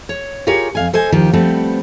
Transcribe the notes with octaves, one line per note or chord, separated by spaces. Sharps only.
C#5
F4 G4 G#4 A#4 C#5
F2 F5 G#5
A4 C5 D#5 G#5
D#2 D#3 F3 G4
F3 G3 A3 B3 C4